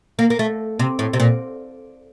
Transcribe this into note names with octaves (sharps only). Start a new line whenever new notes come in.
A#3
A#3
A3
C3
A2
C3
A#2